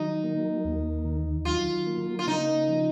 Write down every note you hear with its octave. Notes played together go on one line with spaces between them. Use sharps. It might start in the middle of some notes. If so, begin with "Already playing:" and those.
Already playing: D#3 F#3 D#4
A#3
D#2
D#3
F#3 F4
A#3
F4
C#3 D#4
F3